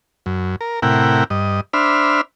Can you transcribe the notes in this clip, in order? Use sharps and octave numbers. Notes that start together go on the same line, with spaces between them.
F#2
A#4
A2 C3 E4 A#4 F#5 G5
G2 D#5
D4 C5 E5 B5 F6